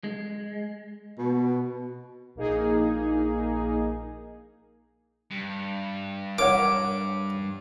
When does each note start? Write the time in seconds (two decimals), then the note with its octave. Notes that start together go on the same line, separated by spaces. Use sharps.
0.04 G#3
1.18 B2
2.35 A#1 A#3 D#4 G#4
5.31 G2
6.38 A#4 C#5 F#5 D6